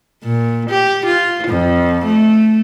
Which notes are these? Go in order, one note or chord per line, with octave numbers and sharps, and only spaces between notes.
A#2
G4
F4
F2
A3